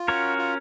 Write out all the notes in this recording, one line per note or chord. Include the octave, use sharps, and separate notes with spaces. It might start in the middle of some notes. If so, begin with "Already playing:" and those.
Already playing: F4
C#4 F#4 A#4 C#5
F4